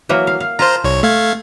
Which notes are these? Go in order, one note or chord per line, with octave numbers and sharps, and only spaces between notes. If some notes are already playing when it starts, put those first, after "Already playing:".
E3 F#3 A#3
F5
F5
F4 C5 A5 A#5
C2 C#5
A3 F5 G#6